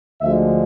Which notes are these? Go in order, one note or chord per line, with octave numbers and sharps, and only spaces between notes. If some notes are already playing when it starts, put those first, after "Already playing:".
D2 D3 F3 G#3 E5